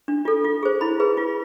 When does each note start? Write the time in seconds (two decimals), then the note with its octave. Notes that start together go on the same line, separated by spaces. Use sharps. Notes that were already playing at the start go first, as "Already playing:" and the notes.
0.08 D4
0.25 F4 A4
0.45 F4
0.63 G#4 C5
0.81 E4 B5
1.00 G#4 B4
1.17 F4